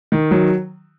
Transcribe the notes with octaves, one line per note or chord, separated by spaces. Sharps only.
D#3
F#3